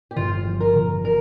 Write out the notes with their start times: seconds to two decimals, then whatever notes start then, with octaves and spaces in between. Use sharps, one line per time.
0.11 G4
0.16 G1 F4
0.46 F3
0.60 A#4
0.75 G1
1.05 A#4